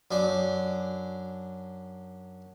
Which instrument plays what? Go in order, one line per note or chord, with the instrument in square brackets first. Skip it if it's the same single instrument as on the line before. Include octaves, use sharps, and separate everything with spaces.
[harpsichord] F#2 D4